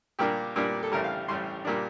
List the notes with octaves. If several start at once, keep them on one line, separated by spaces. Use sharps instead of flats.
A#2 G3 A#3 D4 G4
A#2 G3 A#3 D4
A4
A1 A2 G3 A#4
F5
A1 A2 G3 C6
A#2 G3 A#3 D4